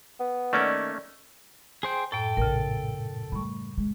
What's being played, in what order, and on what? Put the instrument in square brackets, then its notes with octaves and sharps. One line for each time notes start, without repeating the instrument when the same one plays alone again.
[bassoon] B3
[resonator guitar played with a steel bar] D#3 D5 [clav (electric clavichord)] A3 A#3 C#4
[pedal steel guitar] G#4 C5 G5
[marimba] F#2 A2 [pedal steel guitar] A4 G5
[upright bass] A#1 [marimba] C#3 A#4
[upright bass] G3 A3 [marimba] B5 C#6
[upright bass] G#3